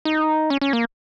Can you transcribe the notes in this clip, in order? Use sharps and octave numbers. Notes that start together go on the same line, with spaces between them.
D#4
C#4
C#4
A#3